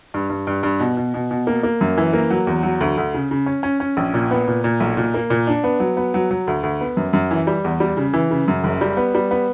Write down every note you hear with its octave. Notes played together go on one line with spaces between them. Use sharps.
G2
G2
G2
G2
B2
B2
B2
B2
A#3
A#3
F#2
E3
A#3
F#3
E2
F#3
D2
D2
C#3
C#3
C#4
C#4
C#4
A#1
A#2
B3
A#2
A#2
B1
A#2
A#3
A#2
D4
B3
F#3
B3
F#3
F#3
D2
D2
B3
F#2
F#2
E3
G3
E2
G3
C#3
E3
C#3
F#2
F#1
G3
B3
G3
B3